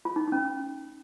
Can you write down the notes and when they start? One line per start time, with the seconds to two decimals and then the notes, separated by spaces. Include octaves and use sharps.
0.05 F4
0.16 D#4
0.28 D#4
0.32 C#4